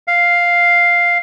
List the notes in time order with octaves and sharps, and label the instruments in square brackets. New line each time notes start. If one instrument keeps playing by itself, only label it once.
[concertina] F5